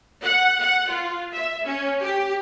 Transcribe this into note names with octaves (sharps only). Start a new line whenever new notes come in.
F#5
F#5
F4
E5
C#4
G4